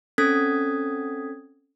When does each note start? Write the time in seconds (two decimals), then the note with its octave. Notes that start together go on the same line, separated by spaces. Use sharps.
0.18 C4 C#4 A4 D#6 G#6 B6